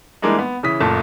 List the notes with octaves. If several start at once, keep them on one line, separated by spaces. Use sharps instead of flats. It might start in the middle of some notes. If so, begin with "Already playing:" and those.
E3 G3 G#3 A#3 D4 D#4
B3
C#3 E3 D#6 B6
F#1 A#2 A3 A5